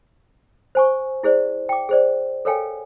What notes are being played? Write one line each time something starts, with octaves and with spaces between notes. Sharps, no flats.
C5 G#5 C#6
E4 G#4 C5 D5
G5 D6
G#4 C5 D5
A4 A#4 C#5 F5 G5 G#5